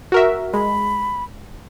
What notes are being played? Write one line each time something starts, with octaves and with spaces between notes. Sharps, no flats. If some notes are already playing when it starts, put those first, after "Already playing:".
F#4 A#4 E5
G#3 B5